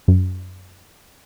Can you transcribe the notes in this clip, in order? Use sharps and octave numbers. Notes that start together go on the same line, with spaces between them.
F#2